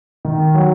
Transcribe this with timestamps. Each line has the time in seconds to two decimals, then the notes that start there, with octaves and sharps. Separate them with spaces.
0.25 D#3
0.54 F#3